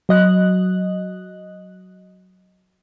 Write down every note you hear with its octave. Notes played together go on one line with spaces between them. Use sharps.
F#3 D#5 F#6